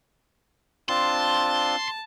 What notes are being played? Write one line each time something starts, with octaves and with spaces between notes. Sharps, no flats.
C4 D4 F4 A5 C6